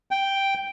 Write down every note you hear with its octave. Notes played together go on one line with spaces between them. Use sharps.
G5